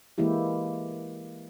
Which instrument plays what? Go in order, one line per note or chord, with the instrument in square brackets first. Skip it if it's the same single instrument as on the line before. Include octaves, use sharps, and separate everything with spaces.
[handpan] E3 G#3 A#3 E4 G4